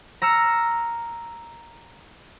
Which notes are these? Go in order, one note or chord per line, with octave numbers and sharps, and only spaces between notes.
A#5 E6 F6 C#7